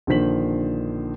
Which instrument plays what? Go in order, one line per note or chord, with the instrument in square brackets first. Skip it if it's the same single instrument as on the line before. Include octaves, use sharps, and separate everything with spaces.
[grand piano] A#1 D3 D#3 C5 B6 F#7